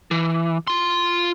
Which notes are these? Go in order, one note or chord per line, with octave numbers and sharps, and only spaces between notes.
E3
F4 C6